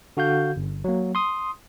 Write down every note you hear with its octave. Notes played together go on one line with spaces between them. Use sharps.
D3 F#4 F5 G6
G1
F#3 A#3
C6 D#6